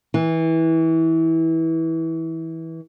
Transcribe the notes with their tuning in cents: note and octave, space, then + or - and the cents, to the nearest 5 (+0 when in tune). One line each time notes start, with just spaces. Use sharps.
E3 -20